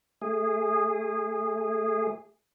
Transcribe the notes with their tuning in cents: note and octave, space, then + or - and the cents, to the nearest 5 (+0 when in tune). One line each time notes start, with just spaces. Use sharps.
A3 +0 G#4 -20